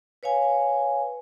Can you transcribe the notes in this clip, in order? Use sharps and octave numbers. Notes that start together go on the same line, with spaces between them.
B4 C#5 F5 G#5